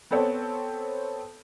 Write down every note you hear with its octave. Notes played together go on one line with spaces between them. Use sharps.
B3 C4 A4 C#5